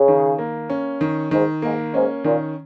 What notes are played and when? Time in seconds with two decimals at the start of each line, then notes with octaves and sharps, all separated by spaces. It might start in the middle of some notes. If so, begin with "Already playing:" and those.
Already playing: C#3
0.08 D#3
0.39 A#3
0.70 C#4
1.01 D#3
1.31 G#2 D#3
1.62 G#2 A#3
1.94 G#2 C#4
2.24 A#2 D#3